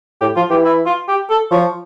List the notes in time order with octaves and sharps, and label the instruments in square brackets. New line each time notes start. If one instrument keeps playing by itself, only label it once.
[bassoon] A2 [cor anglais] G4
[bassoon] F3 [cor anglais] F4
[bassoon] E3 [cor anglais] G4
[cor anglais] E4
F4
G4
A4
[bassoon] F3 [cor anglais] C#5